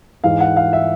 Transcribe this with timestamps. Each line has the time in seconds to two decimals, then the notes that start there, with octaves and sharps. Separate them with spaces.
0.24 G#2 E3 F5
0.40 F#5
0.57 F5
0.73 E5